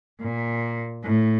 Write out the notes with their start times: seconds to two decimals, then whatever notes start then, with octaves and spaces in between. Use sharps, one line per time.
0.21 A#2
1.04 A2